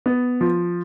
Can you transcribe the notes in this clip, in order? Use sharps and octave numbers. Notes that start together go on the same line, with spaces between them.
B3
F3